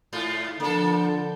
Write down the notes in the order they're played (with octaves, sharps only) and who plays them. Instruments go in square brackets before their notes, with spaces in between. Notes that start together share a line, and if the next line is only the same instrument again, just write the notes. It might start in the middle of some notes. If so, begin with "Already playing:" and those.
[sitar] G#2 F4
[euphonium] D3 [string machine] F3 G6 [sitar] A#3 A4